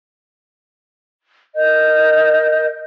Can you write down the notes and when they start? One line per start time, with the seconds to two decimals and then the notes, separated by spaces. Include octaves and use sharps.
1.55 A#4 D#5 G6